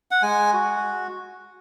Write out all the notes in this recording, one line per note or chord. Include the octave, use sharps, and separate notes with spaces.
F#5
G#3 G#5
F#4